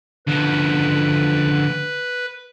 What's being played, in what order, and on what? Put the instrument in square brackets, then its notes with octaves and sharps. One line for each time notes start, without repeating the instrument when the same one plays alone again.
[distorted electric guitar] D2 F3 [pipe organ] B4